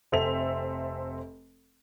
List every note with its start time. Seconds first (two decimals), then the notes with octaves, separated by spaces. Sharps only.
0.12 F1 C4 A4 E5 F7